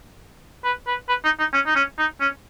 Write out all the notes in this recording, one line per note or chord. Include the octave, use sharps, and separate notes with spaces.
B4
B4
B4
D#4
D#4
C#4
D#4
C#4
D#4
C#4